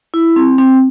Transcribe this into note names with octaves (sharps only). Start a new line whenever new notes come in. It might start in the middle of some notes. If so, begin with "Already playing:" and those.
E4
C4
C4